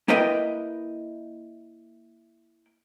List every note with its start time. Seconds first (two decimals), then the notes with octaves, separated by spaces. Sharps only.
0.08 A#3 E4 A#4 B4 D#5 G5